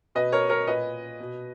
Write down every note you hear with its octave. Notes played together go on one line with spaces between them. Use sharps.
B2 B4 D#5
A#4 C#5
A#4 C#5
A#2 B4 D#5
B2